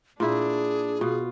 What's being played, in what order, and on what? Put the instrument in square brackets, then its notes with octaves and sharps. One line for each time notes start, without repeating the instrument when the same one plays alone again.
[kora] A#2 E4 [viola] D4 [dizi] G#4
[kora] B2 [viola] F4